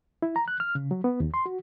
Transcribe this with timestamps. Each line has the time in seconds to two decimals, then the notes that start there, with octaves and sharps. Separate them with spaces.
0.22 E4
0.36 A#5
0.48 F#6
0.60 F6
0.75 C#3
0.91 F#3
1.04 B3
1.20 D#2
1.34 C6
1.46 F#4